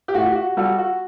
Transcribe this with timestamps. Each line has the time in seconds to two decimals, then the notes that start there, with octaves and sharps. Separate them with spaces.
0.08 G4
0.14 A2 F#4
0.25 G4
0.35 F#4
0.57 G3 F#4 A4
0.78 F#4